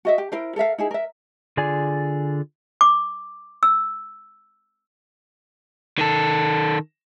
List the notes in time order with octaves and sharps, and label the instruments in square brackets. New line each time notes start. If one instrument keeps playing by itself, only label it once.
[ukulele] F#4 D#5 E5
G4
E4 A#4 C5
A4 A#4 E5 F5
D#4 E4 G#4
A#4 E5
[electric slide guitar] D3 F4 G#4 D5 G#5
[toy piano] D6
E6
[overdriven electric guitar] D#3 A4